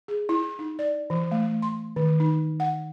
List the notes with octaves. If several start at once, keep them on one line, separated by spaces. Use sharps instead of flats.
G#4
E4
D#4
D5
E3
A3
C6
D#3
D#4
F#5